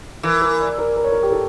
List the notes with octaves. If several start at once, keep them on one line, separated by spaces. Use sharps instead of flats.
E3 A#4
A#4
D5
A#4
A#4
C#5
A#4
G4
A4